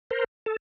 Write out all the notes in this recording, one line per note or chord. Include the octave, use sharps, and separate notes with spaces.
A#4 C5
A4